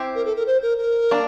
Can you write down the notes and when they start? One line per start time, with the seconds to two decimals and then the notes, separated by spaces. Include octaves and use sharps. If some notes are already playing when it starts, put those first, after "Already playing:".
Already playing: C4 E4 G4 C5
0.15 A#4
0.25 A4
0.36 A#4
0.47 C5
0.62 A#4
0.78 A#4
1.11 A#3 D4